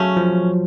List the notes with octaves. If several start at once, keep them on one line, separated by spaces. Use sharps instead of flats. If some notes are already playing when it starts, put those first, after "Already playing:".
Already playing: C#3 F#3 A3 C#4
F3